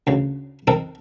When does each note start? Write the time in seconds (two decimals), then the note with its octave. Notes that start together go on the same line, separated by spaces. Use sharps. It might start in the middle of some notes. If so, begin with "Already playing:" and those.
0.07 D2 C#3
0.67 C4 D#4 A4 A#4